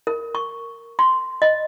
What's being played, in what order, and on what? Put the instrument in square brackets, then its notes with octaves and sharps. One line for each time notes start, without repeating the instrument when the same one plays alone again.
[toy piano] A#4
C#6
C6
D#5